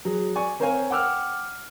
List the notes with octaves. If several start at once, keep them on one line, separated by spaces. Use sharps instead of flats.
F#3 G#4
D5 G#5 C#6
C4 A#4 C5 C#5 F5 G#5
F#5 G5 D6 E6 F6